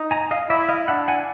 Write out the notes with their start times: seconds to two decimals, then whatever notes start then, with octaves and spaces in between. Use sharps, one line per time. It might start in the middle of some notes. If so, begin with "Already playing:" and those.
Already playing: D#4
0.11 G#5 A#5
0.31 D#5 F5
0.50 E4 D5 E5
0.69 D#5 F5
0.88 D4 E5 F#5
1.08 F#5 G#5